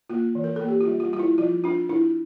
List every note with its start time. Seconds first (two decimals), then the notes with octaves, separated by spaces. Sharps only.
0.10 A#3 F4
0.35 E3
0.44 A#4
0.56 A#3 A4
0.68 G4
0.81 F4
0.88 G3
1.00 F4
1.13 G3 F4
1.19 E4
1.38 F3 F4
1.64 D4 F4
1.89 D4 E4